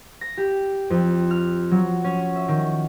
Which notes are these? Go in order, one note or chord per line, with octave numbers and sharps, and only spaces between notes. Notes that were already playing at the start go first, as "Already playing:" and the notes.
A#6
G4
F2
F6
F#3
C#4
E5
D#3